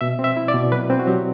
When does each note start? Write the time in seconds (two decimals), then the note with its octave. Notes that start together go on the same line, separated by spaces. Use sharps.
0.01 B2 E5
0.19 C4
0.24 E5
0.37 E4
0.48 D5
0.54 B2
0.72 F#3 B4
0.90 C4
0.99 F#4
1.07 F#3 G4